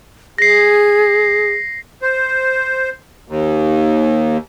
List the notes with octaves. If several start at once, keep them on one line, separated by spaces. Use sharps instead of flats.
G#4 A#6 C7
C5
D#2